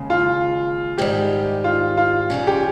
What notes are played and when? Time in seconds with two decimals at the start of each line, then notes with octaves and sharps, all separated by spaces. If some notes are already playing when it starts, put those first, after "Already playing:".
Already playing: D#2 C#3 G#3
0.10 F4
0.98 G#2 D#3 G3 G4
1.64 F4
1.97 F4
2.30 F2 C#3 G3 C#4
2.47 G4